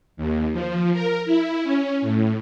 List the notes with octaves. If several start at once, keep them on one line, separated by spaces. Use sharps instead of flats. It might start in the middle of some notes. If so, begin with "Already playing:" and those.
D#2
F3
A#4
E4
C#4
A2